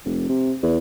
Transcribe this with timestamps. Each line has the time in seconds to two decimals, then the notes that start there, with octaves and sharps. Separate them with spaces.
0.05 F1
0.29 C3
0.63 E2